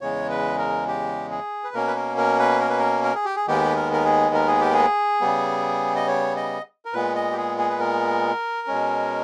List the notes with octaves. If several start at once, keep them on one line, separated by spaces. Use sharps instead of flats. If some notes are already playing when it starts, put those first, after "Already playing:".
E2 C#3 G#3 C#5
B4
A#4
G4
G#4
B4
B2 A#3 C#4 A#4
B4
A#4
A#4
B4
A#4
B4
A#4
A#4
G#4
G4
G#4
D#2 D#3 G#3 B3 G4
A#4
A#4
G#4
A#4
G#4
G4
G#4
C#3 G3 B3
D#5
C#5
D#5
A#4
A#2 G#3 B3 B4
D#5
G4
G#4
G#4
B4
A#4
B2 G#3 C#4